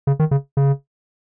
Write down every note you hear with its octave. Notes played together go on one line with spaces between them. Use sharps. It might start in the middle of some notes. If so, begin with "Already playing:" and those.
C#3
D#3
C#3
C#3